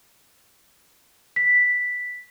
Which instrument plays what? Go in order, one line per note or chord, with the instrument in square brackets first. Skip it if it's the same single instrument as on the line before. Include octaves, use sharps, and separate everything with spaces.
[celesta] B6